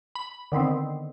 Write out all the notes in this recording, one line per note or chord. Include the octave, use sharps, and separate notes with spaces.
B5
D3 D#3 B3 C4